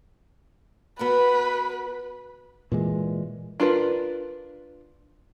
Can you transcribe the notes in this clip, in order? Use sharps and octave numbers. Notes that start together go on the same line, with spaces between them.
B3 F#4 A#4 B4
A#2 E3 G#3
D4 F4 A#4 B4